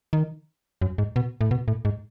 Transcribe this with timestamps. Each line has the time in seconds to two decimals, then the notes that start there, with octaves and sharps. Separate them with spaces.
0.13 D#3
0.82 F#2
0.98 G#2
1.16 B2
1.41 A2
1.51 B2
1.68 A2
1.85 G#2